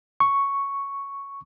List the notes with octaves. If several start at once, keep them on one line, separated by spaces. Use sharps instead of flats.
C#6